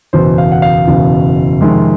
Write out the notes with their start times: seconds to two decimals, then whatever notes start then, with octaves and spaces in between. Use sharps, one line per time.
0.13 F#1 E2 B2 C5
0.38 F5
0.52 F#5
0.62 F5
0.87 F#1 E2 B2
1.61 F2 C3 D#3 G#3